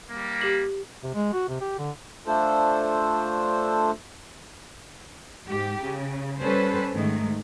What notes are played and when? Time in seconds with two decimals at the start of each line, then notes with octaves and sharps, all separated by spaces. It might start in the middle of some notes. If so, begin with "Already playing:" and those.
0.11 G3 A#3
0.41 G4 F#7
1.03 C3
1.14 G#3
1.33 F#4
1.49 C3
1.61 G4
1.79 D3
2.27 A3 D4 F4 A4 C5
5.46 G#2 G4
5.81 C#3
6.40 G3 C#4 A4 B4 C5
6.94 G#2 D#3 G#3 A3